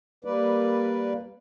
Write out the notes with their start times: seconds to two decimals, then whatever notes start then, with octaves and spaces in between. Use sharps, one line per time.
0.25 G3 A#3 B4 D5